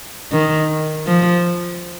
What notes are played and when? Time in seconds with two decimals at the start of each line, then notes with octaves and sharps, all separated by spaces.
0.32 D#3
1.07 F3